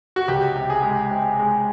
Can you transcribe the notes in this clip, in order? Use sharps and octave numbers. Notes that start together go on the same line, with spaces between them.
F#4
C#2 G4
C3
G#4
G#3
C3
G#3